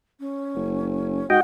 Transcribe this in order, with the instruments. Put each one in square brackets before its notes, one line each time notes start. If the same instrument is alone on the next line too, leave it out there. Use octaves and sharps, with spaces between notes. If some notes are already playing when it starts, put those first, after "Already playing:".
[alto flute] C#4
[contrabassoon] F#1
[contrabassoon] G#2 [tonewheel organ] F#4 D#5 G5 [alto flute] F#5